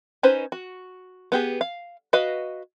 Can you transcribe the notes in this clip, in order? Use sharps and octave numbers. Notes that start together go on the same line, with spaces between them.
C#4 D#4 B4 C5
F#4
B3 G4 G#4
F5
F#4 B4 D#5 F5